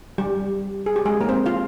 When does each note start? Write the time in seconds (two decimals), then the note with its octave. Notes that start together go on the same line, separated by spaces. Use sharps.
0.18 G3 G4
0.86 G#4
0.96 G4
1.05 G#3 G#4
1.21 A#3 A#4
1.29 C4 C5
1.46 F4 F5